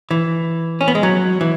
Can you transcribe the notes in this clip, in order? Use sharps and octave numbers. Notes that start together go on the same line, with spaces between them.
E3
C#4
B3
G#3
F#3
E3